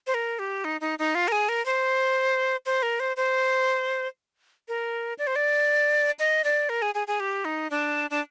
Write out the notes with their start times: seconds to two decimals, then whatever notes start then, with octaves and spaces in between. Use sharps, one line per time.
0.07 C5
0.14 A#4
0.39 G4
0.64 D#4
0.81 D#4
0.99 D#4
1.15 F4
1.28 A#4
1.32 G#4
1.49 A#4
1.66 C5
2.66 C5
2.83 A#4
3.00 C5
3.17 C5
4.68 A#4
5.19 D5
5.27 C5
5.36 D5
6.19 D#5
6.44 D5
6.69 A#4
6.82 G#4
6.95 G#4
7.07 G#4
7.20 G4
7.45 D#4
7.71 D4
8.10 D4